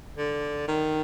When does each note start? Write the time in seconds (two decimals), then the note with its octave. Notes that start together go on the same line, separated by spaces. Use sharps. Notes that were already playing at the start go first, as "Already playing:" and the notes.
0.17 D3
0.67 D#3